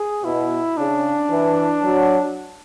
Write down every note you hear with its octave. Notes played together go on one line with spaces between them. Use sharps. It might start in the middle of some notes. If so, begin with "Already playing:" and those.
Already playing: G#4
B2 E4
C#3 D4
E3
F#3